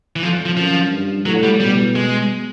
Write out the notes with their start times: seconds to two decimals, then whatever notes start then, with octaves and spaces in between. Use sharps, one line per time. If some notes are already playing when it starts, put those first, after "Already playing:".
0.16 E3
0.23 F2 F3
0.46 F3
0.57 F#2 F3
0.92 G2
1.26 A2 F#3
1.43 G3
1.60 B2 G3
1.96 G#3